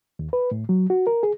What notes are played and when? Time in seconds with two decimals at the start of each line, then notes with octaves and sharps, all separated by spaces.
0.19 D#2
0.33 B4
0.51 A2
0.69 F#3
0.90 F#4
1.07 A#4
1.23 G#4